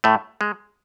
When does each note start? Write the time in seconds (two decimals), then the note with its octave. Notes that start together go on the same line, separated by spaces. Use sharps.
0.04 A2 A3
0.41 G#3